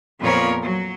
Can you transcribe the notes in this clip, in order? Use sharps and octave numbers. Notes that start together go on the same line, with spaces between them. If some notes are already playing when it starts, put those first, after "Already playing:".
F2 A#2 F3 B3 A#4 C#5
F#3